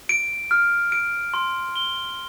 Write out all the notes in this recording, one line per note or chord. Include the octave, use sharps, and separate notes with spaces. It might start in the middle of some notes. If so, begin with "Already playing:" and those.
D7
F6
D7
C6
G7